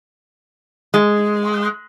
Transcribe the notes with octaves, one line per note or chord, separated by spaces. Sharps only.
G#3